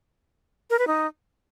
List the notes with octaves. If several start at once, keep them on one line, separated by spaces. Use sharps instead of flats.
A#4
B4
D#4